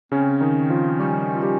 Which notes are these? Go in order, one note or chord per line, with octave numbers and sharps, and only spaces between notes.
C#3 C4 C#4
D#3 D#4
F3 F4
G3 C#4 G4
F4
G3 G4